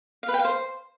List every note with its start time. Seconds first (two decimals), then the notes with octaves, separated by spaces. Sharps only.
0.23 F5
0.28 B4
0.34 G5
0.39 F5
0.45 C5